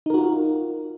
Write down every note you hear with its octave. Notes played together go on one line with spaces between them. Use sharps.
D#4 F4 F#4 A#4